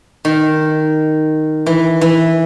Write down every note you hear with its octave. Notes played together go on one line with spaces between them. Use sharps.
D#3
E3
E3